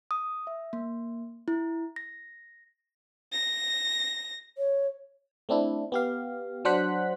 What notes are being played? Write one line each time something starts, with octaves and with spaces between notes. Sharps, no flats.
D#6
E5
A#3
E4
A#6
A#6
C#5
A3 C4 D4 E4
B3 G4 F5
F#3 D4 C5 F#5 F#6 B6